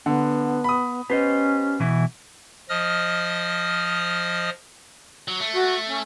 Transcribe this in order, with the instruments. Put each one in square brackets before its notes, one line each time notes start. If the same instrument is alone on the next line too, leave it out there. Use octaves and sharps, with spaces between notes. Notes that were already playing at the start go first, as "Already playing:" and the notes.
[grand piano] D3 [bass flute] B3
[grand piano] B5 D#6
[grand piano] B3 [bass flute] C#4 [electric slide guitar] G4 C5 D#5
[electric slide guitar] B2 E3 E4
[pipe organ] F3 D#5 D#6 F6
[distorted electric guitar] F#3
A3
[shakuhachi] F#4
C#4